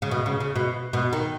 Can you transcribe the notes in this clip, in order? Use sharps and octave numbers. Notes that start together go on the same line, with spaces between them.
C#3
B2
C#3
C#3
B2
B2
D#3